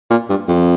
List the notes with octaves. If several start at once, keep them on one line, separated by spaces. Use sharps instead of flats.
A#2
G2
F2